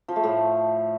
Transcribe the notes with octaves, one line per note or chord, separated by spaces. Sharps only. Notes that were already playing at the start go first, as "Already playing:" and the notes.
F3
A3
A2